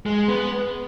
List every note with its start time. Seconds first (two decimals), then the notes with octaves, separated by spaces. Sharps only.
0.06 G#3
0.28 B3